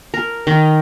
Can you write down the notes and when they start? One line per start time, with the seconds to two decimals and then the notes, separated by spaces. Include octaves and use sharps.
0.14 A#4
0.47 D#3